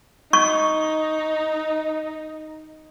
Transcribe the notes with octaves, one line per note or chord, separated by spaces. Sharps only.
D#4 C#6